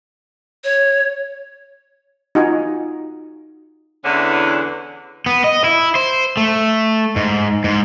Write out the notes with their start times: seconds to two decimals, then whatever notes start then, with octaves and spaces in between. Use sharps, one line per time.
0.64 C#5
2.35 D#4 F4 F#4 G#5 A#5
4.05 E2 D3 E3 C#4
5.26 B3
5.44 D#5
5.64 E4
5.95 C5
6.37 A3
7.16 G#2
7.64 G#2